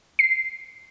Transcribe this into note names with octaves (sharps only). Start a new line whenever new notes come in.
C7